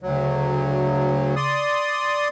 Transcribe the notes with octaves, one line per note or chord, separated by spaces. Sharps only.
D2 C#3 F#3
D5 C6 D#6